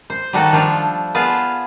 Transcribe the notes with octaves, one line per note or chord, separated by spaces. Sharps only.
C5
D#3 G3 A3 F#4 A4
F3 G3 D4 F4
B3 F4 G#4 F5 A5